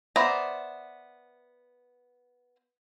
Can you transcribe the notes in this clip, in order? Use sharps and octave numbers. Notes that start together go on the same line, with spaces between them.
B3 C5 D5 E5 A#5